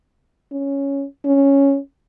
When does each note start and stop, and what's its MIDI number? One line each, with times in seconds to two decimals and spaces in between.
0.52 1.05 61
1.25 1.78 61